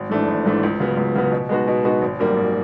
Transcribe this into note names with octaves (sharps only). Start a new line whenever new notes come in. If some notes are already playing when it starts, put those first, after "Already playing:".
Already playing: G#1
G#2 E3 A3 D4
G#1
G#2 E3 A3 D4
C#2
C#3 F#3 B3
C#2
C#3 F#3 B3
B2
G#3 B3 D#4 F#4
B2
G#3 B3 D#4 F#4
G#1
F#2 D#3 G3 A#3
G#1